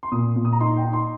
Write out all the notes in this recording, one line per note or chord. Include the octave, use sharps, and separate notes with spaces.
C6
A#2 D#6
A#2
D#6
A#5
D#4 C6
G5
D#4
C6